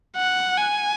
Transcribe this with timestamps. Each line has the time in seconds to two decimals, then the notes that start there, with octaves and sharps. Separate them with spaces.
0.17 F#5
0.57 G#5